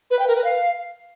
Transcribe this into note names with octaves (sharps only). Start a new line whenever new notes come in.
B4
G5
A#4
B4
F5